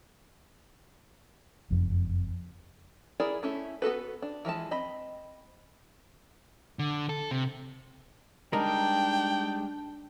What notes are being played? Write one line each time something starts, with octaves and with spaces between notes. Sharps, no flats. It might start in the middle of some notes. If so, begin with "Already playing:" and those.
F#1 F2
E4 G#4 A#4 D5
A3 C#4 E4
B3 F#4 A4 B4
D4
E3 F3 G#3 A5
C4 D#5 B5
D3
A4
C3
G3 G#3 D4 D#4 A#4 G5